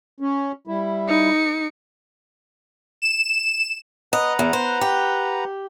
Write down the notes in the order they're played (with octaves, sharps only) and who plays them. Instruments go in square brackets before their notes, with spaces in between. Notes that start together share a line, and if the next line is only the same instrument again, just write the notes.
[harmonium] C#4
G3 E4
[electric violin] D#4 C#7
[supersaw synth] E7
[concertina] B4 F#5 A#5 [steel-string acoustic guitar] D#5
[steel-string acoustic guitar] E2
C5
G4